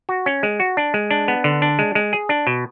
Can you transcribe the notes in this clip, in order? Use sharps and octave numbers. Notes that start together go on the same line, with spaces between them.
F#4
C#4
G#3
F#4
D4
G#3
D4
B3
D3
D4
G#3
G#3
G#4
D4
B2